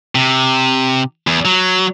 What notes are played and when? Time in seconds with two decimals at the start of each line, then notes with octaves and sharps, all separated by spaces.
0.15 C3
1.27 E2
1.45 F#3